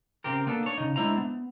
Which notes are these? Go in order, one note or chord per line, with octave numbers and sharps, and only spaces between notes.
C#3 C4 G4 A#4
A#3 B3 D4 A4
D4 C#5
C#3 D#4
G#3 D4 E4 C5 A#5
B3